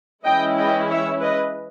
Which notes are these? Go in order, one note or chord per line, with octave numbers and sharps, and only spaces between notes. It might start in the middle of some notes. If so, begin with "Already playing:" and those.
E3 G#3 C#4 E4 D#5 G5
D#5 G5
C#5 E5
B4 D#5